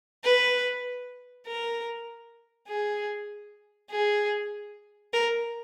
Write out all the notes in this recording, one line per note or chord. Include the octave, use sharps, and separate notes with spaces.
B4
A#4
G#4
G#4
A#4